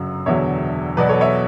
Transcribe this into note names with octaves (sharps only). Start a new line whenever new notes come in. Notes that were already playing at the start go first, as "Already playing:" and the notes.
Already playing: G1 F#2 C#3 F#3
E1 E2 D3 F#3 C#5 E5
E2 B2 F#3 B4 D5
A4 C#5
C#5 E5